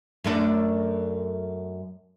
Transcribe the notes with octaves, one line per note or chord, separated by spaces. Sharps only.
F#2 A3 D4